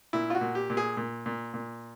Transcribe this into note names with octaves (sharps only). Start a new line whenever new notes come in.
A#2 E4
F4
F#4
A#2
G4
A#2
G#4
A#2
A#2
A#2